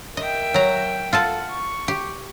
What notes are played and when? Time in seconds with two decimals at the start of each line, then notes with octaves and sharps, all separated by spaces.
0.17 A#4 D#5 E5 G5
0.54 F#3 A#5
1.13 F4 A4 F#5 A5
1.50 C#6
1.88 G4